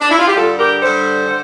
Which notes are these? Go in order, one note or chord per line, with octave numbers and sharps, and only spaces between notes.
D4
E4
F4
G4
G2 D3 G3 F4 A4
G4 A#4
G2 D3 G3 A4 C5
D3